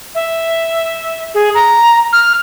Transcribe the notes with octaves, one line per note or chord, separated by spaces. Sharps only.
E5
G#4
A#5
F6